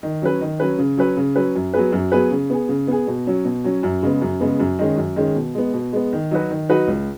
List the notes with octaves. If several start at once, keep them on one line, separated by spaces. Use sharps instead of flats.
D#3
F#3 C#4 B4
D#3
F#3 C#4 B4
C#3
F#3 C#4 B4
C#3
F#3 C#4 B4
F#2
F#3 B3 G#4 B4
F#2
F#3 B3 G#4 B4
C#3
B3 G#4
C#3
B3 G#4
B2
F#3 C#4
B2
F#3 C#4
F#2
C#3 G#3 B3
F#2
C#3 G#3 B3
F#2
D#3 G#3 C#4
F#2
D#3 G#3 C#4
B2
G#3 B3
B2
G#3 B3
D#3
F#3 D#4 F#4 B4
D#3
F#3 D#4 F#4 B4
C#2